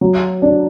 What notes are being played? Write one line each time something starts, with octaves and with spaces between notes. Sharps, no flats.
F#3
D4